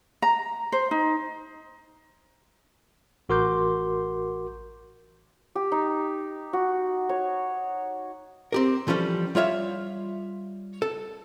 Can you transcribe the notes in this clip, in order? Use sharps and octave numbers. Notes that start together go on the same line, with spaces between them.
A#5
C5
D#4
A1 F#4 A#4 C6 D6 G6
G4
D#4
F#4
C#5
C4 G4 A#4
E3 F3 G3 C#4 A4
G3 F4 C#5 E5 F5
A4